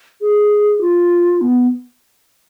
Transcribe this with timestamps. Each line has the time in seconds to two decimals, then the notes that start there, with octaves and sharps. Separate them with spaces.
0.21 G#4
0.81 F4
1.41 B3